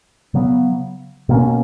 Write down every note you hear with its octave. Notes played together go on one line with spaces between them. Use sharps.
C#3 F#3 B3
B2 A#3 C#4